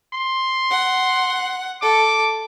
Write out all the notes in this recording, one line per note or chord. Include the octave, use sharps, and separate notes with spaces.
C6
F#5
A4 D6